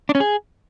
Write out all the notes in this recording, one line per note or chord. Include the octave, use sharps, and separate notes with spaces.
D4
C#4
G#4